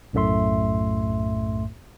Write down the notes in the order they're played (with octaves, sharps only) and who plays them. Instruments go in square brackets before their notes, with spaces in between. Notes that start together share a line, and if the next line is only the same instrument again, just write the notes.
[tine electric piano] B1 F#2 A2 A3 E5 C6